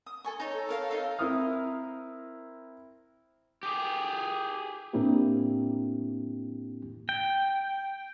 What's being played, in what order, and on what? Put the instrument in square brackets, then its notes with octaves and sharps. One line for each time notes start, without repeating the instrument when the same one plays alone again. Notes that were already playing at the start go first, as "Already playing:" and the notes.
[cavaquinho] D#6
A4 G#5 C#6
D#4 C#5
[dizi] A4
[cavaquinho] A#4 C#5 F5
D#4 F5
[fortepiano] C4 E4 A#4 D#6 F6
[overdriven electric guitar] G4 G#4
[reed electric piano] A2 A#3 C4 D4 E4 G4
[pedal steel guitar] G5